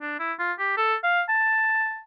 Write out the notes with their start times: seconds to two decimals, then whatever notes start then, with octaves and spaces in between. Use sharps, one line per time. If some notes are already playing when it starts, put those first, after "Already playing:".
0.01 D4
0.19 E4
0.39 F4
0.59 G4
0.77 A4
1.04 F5
1.29 A5